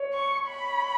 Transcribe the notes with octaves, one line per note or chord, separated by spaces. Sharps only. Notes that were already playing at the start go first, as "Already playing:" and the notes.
Already playing: C#5
C#6
B5